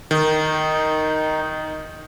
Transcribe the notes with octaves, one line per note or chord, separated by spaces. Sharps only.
D#3 D#4